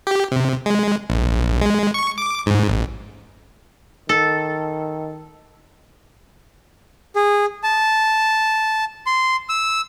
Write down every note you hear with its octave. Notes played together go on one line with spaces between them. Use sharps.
G4
C3
G#3
A#1
G#3
C#6
D6
G#2
A1
D#3 A4
G#4
A5
C6
E6